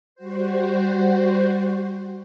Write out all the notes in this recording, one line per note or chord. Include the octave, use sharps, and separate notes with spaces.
G3 F#4 C5